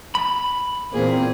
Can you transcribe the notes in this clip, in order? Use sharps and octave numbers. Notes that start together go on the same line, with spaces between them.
B5
E2 A#2 A#3 C4 G#4